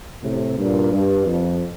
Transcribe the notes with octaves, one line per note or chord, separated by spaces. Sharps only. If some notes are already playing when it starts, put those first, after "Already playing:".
A2 C3
G2 A#2
G2
F2